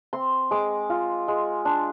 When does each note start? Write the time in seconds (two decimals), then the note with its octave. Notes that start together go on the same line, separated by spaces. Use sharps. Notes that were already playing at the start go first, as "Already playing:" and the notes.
0.13 C4 C6
0.51 G#3 D6
0.90 F4
1.28 G#3
1.65 D4